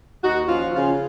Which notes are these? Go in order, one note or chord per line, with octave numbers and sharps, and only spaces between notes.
D#2 D#4 F#4
F3 C#4 F4
C#3 C#4 F4